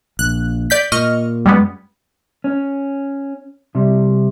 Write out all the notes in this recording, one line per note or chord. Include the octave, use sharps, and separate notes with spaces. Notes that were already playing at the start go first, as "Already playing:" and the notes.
A#1 F#6
D5 G6 B6
A#2 D#5 C#6 F6
F#2 G3 G#3 B3
C#4
C3 G3